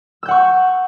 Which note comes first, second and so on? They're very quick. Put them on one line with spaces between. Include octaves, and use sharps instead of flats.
E6 G6 F#5 C#6